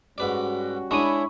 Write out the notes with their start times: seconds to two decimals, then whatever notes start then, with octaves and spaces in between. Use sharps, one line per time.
0.18 G#2 G3 C#4 F#4 B4 D5
0.91 G#3 D4 E4 G#4 C#5 B5 C#6 D#7